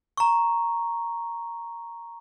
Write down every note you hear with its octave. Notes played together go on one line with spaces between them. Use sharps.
A#5 C#6